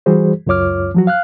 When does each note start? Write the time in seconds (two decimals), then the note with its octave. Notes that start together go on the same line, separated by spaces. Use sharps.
0.06 E3 G3 F#4 G#4 C5
0.47 C#2 F#2 F4 C#5 D6 F6
0.95 F3 F#3 F#4
1.07 F5 F6 F#6